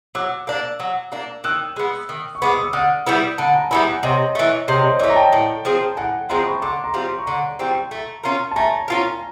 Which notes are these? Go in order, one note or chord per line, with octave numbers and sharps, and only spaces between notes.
F#3 D6 E6
A#3 D4
F#3
A#3 D4
D#3 E6 F#6
G#3 B3
D#3
C#6
G#3 B3 D6
D#6
E6
D3 D#6 F6
G3 B3 E4
D3 A5 B5
G#5 A#5
G3 B3 E4 G#5 A#5
F#5 G#5
C3 C#5 D#5
E3 A3
C3 C#5 D#5
C5 D5
E3 A3 C#5 D#5
A#5
G5 A5
A2
F3 G#3 C4
A2 F#5 G#5
F3 G#3 C4 A#5 C6
B5 C#6
D3 C6 D6
A#5 C6
G3 C4 F4
C#6
D3 A#5 C6
G3 C4 F4
A3
C#4 F4 A#4
A5
A3 G#5 A#5
C#4 F4 A#4